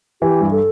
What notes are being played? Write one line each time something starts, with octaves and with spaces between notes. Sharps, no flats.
E3 G4
G2
A4